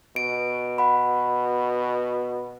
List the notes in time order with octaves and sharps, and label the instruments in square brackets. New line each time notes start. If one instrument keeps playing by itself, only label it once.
[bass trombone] B2 [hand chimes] D7
[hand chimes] F#5 B5